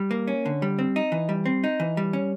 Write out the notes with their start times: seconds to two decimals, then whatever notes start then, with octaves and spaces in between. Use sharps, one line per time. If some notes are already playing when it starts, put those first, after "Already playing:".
Already playing: G3
0.11 A#3
0.27 C#4
0.46 D3
0.62 G3
0.79 C4
0.96 D#4
1.12 E3
1.29 G3
1.46 C4
1.64 D#4
1.80 E3
1.97 G3
2.13 C#4